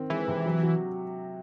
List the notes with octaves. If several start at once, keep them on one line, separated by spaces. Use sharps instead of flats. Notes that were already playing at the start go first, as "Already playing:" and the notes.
Already playing: D#3 C4
E3 G#3
C3
F#3
F#4